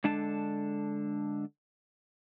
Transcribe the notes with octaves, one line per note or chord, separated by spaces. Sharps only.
D3 G#3 D4 A4 A5